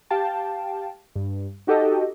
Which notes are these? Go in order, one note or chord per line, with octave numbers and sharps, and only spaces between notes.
G4 F5 G5 A5
G2
D#4 F#4 G4 A4 D#5